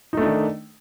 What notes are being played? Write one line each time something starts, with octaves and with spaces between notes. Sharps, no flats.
D#3 A3 D4 D#4